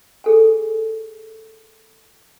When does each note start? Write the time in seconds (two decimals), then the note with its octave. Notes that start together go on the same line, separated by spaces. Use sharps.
0.24 G#4 A4 G#5